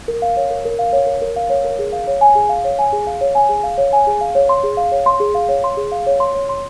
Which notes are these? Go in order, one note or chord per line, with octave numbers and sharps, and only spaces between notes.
A#4
F5
C#5
A#4
A#4
F5
C#5
A#4
A#4
F5
C#5
A#4
G#4
F5
C#5
G#5
G#4
F5
C#5
G#5
G#4
F5
C#5
G#5
G#4
F5
C#5
G#5
G#4
F5
C#5
C6
G#4
F5
C#5
C6
G#4
F5
C#5
C6
G#4
F5
C#5
C6
C#5
C6